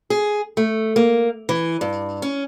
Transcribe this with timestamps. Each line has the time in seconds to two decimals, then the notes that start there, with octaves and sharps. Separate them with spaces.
0.10 G#4
0.57 A3
0.96 A#3
1.49 E3
1.81 G2
2.22 C#4